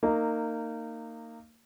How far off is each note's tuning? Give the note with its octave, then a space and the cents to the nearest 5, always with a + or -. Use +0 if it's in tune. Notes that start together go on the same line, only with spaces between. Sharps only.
A#3 -25 D#4 -15